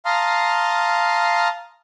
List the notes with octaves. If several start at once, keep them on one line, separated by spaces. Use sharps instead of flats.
F5 A5 A#5 C6 D#6 F6